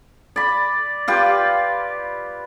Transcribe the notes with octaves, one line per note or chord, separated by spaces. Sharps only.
D5 B5
F4 G4 B4